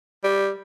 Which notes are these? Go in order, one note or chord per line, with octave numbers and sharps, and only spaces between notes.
G3